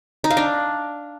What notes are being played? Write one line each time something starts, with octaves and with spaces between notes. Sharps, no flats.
D#4
F5
D4